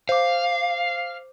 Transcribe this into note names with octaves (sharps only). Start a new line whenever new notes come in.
C5 F5 D6